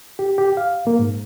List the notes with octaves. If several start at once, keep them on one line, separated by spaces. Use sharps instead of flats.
G4
G4
F5
A#3
G#2